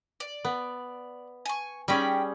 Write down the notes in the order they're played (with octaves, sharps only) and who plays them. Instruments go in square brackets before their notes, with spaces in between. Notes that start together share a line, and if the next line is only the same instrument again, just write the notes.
[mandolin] D5
[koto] B3
[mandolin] G#5 C#6
[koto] G3 C#4 G#4 [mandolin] D#4 G5 B5